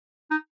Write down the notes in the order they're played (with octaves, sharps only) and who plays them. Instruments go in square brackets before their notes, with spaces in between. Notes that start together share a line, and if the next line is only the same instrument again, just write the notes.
[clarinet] D#4